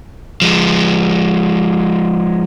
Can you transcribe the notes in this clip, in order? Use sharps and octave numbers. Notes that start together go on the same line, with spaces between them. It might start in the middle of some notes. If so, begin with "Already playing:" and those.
F3 G#3